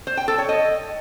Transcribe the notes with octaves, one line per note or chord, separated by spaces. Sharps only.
C5
G5
A4
C#5
D#5